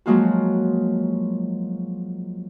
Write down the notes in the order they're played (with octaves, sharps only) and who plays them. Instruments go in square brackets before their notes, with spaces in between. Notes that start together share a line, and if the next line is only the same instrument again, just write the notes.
[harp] F3 F#3 G#3 A#3 F4 F#4